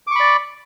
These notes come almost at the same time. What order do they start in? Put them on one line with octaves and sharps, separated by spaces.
D6 C#6 B5 D5